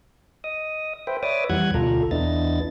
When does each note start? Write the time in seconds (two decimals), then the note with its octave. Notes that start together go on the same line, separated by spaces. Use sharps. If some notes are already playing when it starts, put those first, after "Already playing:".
0.44 D#5 D#6
1.07 B4 C5 E5 G5
1.23 B4 C#5 D5 E5 D6 D#6
1.50 F2 E3 G3 F#5 F#6 G#6
1.74 D2 B2 F4 A4 A#5
2.11 E2 B3 D4 E4 D#5 A6